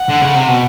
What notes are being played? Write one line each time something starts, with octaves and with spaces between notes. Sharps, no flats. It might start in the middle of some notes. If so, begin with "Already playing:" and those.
Already playing: F#5
D3
C#3
C3
B2